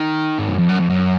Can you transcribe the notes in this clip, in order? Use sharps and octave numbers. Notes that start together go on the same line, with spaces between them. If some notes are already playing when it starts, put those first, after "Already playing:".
Already playing: D#3
G#2
F#2
F2
F#2
F2
F#2